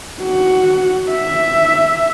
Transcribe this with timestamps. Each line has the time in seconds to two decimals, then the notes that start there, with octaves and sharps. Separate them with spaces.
0.22 F#4
1.11 E5